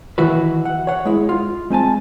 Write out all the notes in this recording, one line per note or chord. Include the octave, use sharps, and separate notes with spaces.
D#3 E3 E4 F#4 B4
F#5
C#5 F#5
G#3 E4
F4
G#3 C4 G#5 A5